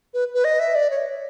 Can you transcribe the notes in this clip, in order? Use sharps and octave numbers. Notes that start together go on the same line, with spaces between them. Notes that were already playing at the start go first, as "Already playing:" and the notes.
B4
B4
D#5
E5
D5
C#5